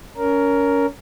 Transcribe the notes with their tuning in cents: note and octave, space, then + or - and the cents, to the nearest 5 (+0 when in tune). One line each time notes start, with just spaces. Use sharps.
C#4 +25 A#4 +0